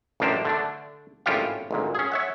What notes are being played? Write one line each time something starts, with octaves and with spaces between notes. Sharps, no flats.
A1 F#2 A#3 D4 G4 C5
D3 A3 D4
G#1 A2 C#4 F4 G4 F5
G#1 D2 A#2
C#4 G#4
C#5 E5 F#5